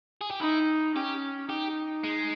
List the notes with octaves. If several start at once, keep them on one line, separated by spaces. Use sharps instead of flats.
G#4
G4
D#4 E4
C#4 G4
D#4 G4
G#3